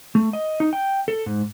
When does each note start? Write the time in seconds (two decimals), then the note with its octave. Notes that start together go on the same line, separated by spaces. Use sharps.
0.15 A3
0.33 D#5
0.60 D#4
0.73 G5
1.08 A4
1.26 G#2